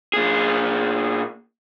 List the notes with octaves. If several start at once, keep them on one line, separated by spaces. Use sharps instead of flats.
A#2 G#4